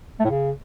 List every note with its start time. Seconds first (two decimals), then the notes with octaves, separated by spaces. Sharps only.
0.20 A3
0.25 A2
0.30 C#3